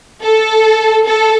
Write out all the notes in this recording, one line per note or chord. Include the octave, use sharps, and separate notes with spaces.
A4
A4